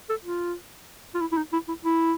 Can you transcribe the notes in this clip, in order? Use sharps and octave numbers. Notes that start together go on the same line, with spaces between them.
A4
F4
F4
E4
E4
D#4
E4
E4
E4